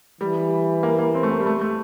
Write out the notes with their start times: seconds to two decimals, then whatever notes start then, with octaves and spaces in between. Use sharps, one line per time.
0.21 E3 G3
0.83 A#3
0.99 A#3
1.15 C4
1.23 A3
1.30 A#3
1.40 G3
1.46 A3
1.61 A3